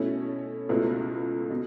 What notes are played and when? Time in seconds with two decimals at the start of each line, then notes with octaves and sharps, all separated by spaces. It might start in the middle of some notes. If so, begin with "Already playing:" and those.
Already playing: B2 A3 C#4 E4
0.69 C#2 B2 A3 E4 B4
1.50 B2